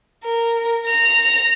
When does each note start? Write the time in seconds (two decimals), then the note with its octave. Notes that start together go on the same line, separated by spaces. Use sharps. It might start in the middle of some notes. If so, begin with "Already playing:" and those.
0.24 A#4
0.87 A#6 F7